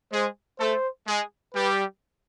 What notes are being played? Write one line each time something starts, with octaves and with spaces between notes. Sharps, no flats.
G#3 G#4 C5
A3 A4 C5
G#3 G#4
G3 G4 B4